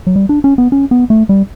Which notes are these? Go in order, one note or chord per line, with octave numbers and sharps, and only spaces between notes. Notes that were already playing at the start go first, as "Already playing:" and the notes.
F#3
G3
D4
C#4
B3
C#4
B3
A3
G3